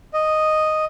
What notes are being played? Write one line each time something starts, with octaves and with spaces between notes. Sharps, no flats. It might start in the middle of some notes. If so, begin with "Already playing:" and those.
D#5